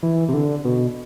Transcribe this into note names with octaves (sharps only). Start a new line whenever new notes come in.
E3
C3
D3
B2